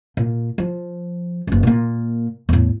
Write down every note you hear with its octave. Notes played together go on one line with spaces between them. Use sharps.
A#2
F3
F#1 C#2
A#2 A#3
E2 A2